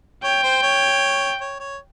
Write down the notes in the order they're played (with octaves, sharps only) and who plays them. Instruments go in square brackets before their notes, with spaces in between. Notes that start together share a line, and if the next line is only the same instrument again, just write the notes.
[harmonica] C#5 [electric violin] G5
[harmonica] C5
C#5
C#5
C#5